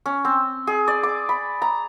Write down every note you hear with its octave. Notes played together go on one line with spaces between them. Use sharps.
C#4
C4
G#4
D5
D6
B5
A#5